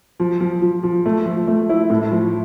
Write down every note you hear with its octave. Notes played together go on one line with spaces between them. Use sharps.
F3
F3
F3
F3
A3
F3
A3
E4
A2
F3